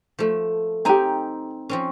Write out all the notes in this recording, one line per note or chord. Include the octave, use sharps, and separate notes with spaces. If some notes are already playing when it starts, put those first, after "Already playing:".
F3 A3
C4 D#4 G4 G#5 A#5
F3 C4 C#4